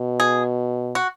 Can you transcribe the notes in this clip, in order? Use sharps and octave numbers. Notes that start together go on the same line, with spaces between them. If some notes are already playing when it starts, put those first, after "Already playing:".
Already playing: B2
G#4
F#4